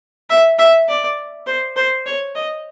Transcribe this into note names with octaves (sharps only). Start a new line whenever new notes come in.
E5
E5
D5
C5
C5
C#5
D#5